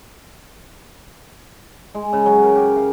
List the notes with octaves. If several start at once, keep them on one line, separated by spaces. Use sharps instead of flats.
G#3
C#3
F#3
A#4
G4
F5